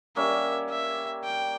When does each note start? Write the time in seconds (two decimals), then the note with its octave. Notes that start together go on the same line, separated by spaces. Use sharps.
0.16 G3 A#3 C#4 E5
0.70 E5
1.24 G5